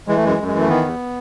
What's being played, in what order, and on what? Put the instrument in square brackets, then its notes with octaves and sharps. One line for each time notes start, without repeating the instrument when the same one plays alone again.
[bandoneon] E3 G#3
A3
F#2 G#3
F#2
E3 G#3
A3
D#3 B3
E2